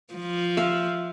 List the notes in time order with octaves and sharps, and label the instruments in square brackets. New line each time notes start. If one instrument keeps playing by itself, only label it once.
[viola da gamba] F3
[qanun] E5 F5